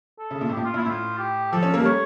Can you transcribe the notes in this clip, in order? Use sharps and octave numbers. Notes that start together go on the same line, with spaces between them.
A4
C#3
A#2
A2
A#2 G4
F4
A#2 E4
A2 F4
G4
F3 A4
C#4
A#3 A#4
G3
A3 C#5